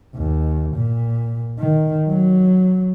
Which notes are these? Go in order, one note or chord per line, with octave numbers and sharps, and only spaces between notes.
D#2
A#2
D#3
F#3